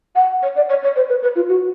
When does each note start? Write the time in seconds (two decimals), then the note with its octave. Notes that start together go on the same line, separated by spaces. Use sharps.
0.15 F#5
0.42 C#5
0.56 D5
0.69 C#5
0.83 C#5
0.96 C5
1.09 B4
1.22 B4
1.35 F4
1.49 F#4